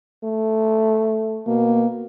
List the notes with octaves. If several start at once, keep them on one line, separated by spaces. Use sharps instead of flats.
A3
B2 A#3